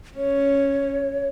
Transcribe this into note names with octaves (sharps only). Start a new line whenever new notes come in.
C#4 C#5